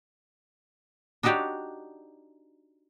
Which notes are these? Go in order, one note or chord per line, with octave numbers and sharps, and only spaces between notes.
D4 D#4 F#4 G4 C#5 D5